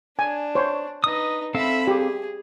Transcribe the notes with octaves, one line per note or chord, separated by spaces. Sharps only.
D4 G#5
C5 C#5
D#4 B4 D#5 D#6
C4 A4 E5 F5 B5
G4 G#4